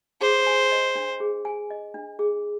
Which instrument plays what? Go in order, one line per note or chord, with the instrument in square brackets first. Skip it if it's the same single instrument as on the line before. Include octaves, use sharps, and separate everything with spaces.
[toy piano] G#4 [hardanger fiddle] C5
[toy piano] G#5
D#5
D4
G#4
G#5
D#5
D4
G#4